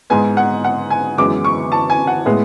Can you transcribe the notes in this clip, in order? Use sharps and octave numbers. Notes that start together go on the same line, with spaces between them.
G#2 G#3 B3 G#5
F#5
F#5
G#5
F#2 E3 G#3 B3 D6
C#6
A5
G#5
F#5
A2 G#3 B3